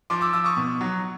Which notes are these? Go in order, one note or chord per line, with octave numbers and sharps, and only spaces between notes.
F3 C6 D6
D6 E6
F3 D6 E6
C#6 D#6
B2
F#3